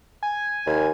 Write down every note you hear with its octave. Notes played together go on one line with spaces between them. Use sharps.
G#5
D#2